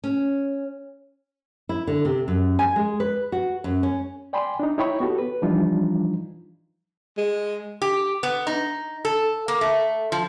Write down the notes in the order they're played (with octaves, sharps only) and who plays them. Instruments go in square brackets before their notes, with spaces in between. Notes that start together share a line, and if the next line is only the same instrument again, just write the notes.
[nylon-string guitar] C#4
E4
D3
C3
F#2
G#5
G#3
B4
F#4
F#2
C#4
[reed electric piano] D5 G5 G#5 B5 C6
D4 D#4
D#4 E4 C#5 G5 B5 C#6
B3 F#4 G4 A4
B4
E3 F3 G3 D4 D#4 F4
[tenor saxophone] G#3
[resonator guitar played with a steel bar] G4
B3
D#4
A4
A#3
A3
F3